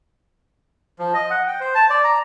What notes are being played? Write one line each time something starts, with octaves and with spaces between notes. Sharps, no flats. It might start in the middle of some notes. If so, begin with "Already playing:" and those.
F3
D#5
F#5
G5
C5
A5
D5
A#5